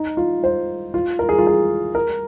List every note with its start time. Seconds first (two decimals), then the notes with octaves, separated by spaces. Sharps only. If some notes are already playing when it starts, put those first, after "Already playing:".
Already playing: D#4
0.17 F4
0.44 C5
0.94 F4
1.19 A#4
1.29 G#4
1.38 F4
1.47 G#4
1.95 A#4